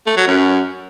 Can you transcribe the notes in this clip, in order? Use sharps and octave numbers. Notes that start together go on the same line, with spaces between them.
A3
F#3
F#2